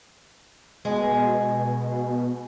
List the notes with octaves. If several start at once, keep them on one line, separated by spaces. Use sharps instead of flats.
B2 G#3